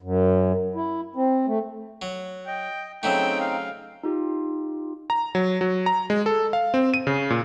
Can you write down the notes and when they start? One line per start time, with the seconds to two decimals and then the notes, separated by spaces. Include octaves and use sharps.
0.02 F#2
0.75 E4
1.16 C4
1.47 A3
2.02 F#3
2.47 D#5 G5
3.03 C#3 F#3 A3 C4 D#4 G5
3.40 F5
4.03 D#4 F4 G4
5.10 A#5
5.35 F#3
5.61 F#3
5.86 A#5
6.10 G#3
6.26 A4
6.53 F5
6.74 C4
6.94 D#7
7.07 C#3
7.30 A#2